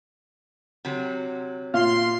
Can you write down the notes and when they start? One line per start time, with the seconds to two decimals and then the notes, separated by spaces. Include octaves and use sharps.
0.85 C3 F#3
1.74 A#2 F5 C6